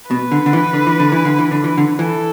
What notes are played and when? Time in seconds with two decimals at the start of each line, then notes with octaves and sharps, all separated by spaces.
0.10 B2 B4
0.31 D3
0.46 D3
0.53 E3
0.73 D3
0.87 E3
1.00 D3
1.12 E3
1.25 D3
1.39 E3
1.51 D3
1.64 E3
1.77 D3
1.98 E3 A4